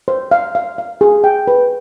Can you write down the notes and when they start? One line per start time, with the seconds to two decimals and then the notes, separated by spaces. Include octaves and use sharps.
0.08 C5
0.31 F5
0.55 F5
0.78 F5
1.01 G#4
1.24 G5
1.47 B4